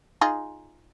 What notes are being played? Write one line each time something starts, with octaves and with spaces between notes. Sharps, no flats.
D#4 F4 G#4